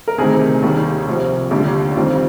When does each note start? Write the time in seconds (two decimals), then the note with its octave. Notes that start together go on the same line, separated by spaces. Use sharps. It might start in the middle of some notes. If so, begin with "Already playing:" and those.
0.08 A#4
0.18 D2 C3 D#3 G#4
0.62 D#2 D#3 G3
1.07 C2 C3 F3
1.51 D#2 D3 G3 G4
1.96 F2 D#3 G3 F4